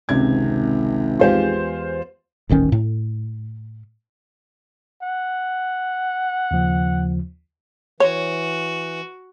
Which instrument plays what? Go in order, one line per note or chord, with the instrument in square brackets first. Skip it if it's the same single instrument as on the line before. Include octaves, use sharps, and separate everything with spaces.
[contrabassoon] G#1 [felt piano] C#2 C3 G#6
[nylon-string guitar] E2 G#3 G4 [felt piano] F4 C5 F5
[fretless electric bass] D#1 A1 D#3 C#4
A2
[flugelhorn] F#5
[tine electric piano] D#2 C#3 F3
[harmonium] E3 [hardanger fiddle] F#4 [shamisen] C#5